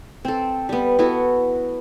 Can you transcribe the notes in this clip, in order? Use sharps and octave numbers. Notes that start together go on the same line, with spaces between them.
C4 A4
G3 B3
B3 E4 F#4 A4